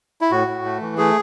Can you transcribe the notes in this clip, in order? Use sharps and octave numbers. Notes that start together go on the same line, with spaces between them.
E4
A2 F#4
A2
A3
E3
A3 G#4